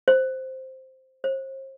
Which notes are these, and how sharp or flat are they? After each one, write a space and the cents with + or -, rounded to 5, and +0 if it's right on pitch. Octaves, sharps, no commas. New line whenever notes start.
C5 +0
C5 +40